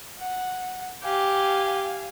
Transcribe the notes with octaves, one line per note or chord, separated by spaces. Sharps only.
F#5
G4 F5 G#5